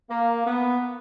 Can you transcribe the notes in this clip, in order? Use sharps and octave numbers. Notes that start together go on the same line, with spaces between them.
A#3
B3